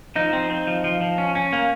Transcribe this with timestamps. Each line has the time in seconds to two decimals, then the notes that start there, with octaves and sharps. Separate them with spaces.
0.16 F3 D#4
0.33 C4
0.50 C4
0.67 F3
0.84 F3
1.01 F3
1.18 C#4
1.35 C#4
1.53 A#3